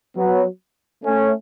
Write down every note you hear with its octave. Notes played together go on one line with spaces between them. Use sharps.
F#3 B3
A3 C#4